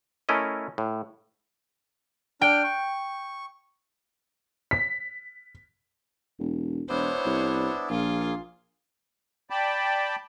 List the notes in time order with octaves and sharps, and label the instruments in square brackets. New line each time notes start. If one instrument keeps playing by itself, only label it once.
[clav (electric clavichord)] A3 C#4 E4 A#4 D#5
A2
[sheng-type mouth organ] D4 F6 [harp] G5
[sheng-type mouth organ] C#6
[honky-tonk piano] B6
[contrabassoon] E1
[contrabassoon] E1 [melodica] B3 D4 E4 [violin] C5 C#5
[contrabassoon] C2
[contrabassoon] A#1 [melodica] A#3 G#4 [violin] F4
[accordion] D5 G5 A5 B5